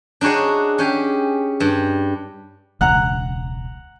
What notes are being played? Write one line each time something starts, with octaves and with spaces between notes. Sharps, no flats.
D4 D#4 F#4 G#4 C#5
C#4 G4 G#4
G2
E1 C#2 F#5 A#5 F#6